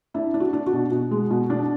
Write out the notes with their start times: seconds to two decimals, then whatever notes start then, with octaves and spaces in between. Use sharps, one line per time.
0.14 D4 E4
0.34 D4
0.40 F#4
0.53 D4
0.66 F#4
0.73 B2
0.91 B2
1.11 G#3
1.31 B2
1.50 D4